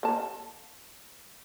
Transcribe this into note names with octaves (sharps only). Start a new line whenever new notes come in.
A#3 A5